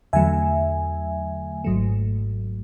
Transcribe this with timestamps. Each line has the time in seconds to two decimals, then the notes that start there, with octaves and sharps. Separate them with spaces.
0.13 E2 D3 F#3 A3 E5 G#5
1.64 G#1 G#2 F#3 A3